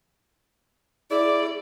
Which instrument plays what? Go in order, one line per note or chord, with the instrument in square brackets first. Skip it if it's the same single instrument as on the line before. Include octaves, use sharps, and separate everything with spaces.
[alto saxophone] E4 [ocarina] G#4 [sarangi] D5